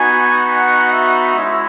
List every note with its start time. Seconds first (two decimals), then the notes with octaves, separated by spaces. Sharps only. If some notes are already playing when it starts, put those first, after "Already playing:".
Already playing: B3 D#4 F#4 G#5
0.51 F#5
0.92 E5
1.34 G#3 C#4 E4